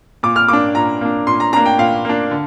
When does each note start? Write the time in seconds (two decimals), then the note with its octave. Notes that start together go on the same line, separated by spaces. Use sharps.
0.23 A#2 D6
0.36 F6
0.48 A#3 D4 D6
0.75 A#2 A#5
1.01 A#3 D4
1.27 A#2 C6
1.40 A#5
1.53 A#3 D4 A#5
1.66 G5
1.79 A#2 F5
2.05 A#3 D4
2.31 D3